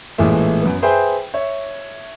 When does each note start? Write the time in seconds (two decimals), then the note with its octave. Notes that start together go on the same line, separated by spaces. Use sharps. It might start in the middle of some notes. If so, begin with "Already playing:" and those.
0.18 A1 A#2 E3 G#3 A3 E5
0.61 F#2 B3
0.82 G#4 B4 C5 E5 G5 G#5
1.34 C#5 E5